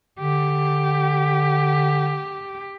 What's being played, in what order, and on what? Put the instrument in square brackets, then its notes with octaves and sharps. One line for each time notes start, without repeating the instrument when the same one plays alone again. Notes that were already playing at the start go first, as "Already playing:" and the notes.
[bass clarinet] D3 [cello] G4